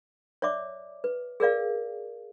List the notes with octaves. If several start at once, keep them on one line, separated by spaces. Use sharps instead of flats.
C#5 D5 E5 D6
B4
G#4 A#4 D5 F5